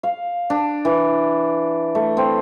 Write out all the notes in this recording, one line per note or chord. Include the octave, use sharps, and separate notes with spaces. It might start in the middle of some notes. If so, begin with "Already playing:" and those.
F5
D4
E3
A3
C4